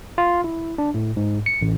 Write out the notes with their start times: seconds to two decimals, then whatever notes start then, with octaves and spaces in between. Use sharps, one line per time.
0.18 F4
0.44 E4
0.78 D4
0.94 A2
1.17 G#2
1.46 C#7
1.61 A1